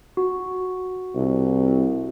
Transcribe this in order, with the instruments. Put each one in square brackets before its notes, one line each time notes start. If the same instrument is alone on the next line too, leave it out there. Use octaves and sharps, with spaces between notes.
[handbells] F#4
[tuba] C2